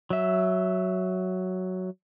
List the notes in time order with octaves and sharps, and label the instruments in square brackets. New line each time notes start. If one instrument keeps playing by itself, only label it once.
[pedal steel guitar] F#3 E5